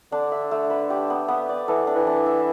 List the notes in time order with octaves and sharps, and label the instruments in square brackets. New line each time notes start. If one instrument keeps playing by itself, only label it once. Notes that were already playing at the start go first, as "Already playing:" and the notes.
[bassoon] D3 [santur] D4
[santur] E5
A3
B4
G4
B3
B3
D5
[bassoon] E3 [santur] A4
[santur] D4
[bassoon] E3
[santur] D4
E5